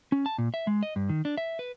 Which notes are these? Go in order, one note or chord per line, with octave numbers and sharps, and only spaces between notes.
C#4
A5
A#2
E5
G#3
D#5
G2
D#3
D4
E5
B4